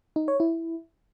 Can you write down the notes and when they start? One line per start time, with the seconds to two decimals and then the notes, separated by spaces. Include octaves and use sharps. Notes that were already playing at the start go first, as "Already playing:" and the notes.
0.16 D#4
0.28 C#5
0.40 E4